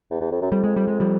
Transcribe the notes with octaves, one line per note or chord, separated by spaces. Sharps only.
E2
E2
F2
F#2
F2 G3
G#3
G3
G#3
F3 G3